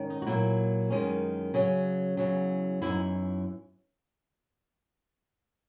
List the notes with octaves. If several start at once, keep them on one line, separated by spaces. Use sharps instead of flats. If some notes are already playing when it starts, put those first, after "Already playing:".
Already playing: G#2 D#3 C#4
D#4
F#4
A#2 F#3 A#3 E4
F#2 D#3 G#3 C#4
C#3 F#3 C#4
E2 C#3 F#3
F#2 E3 B3 D#4 E4